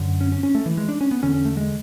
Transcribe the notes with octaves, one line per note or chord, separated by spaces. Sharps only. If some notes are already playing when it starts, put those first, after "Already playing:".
Already playing: F#2 D3
C#4
C#4
C#4
A3
E3
G#3
D4
C#4
B3
E2 D3 C#4
C#4
A3
G#3